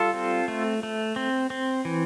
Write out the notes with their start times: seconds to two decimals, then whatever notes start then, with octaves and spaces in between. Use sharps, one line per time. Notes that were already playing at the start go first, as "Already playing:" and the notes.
Already playing: G3 F4 A4
0.14 C4
0.48 A3
0.83 A3
1.16 C4
1.50 C4
1.85 E3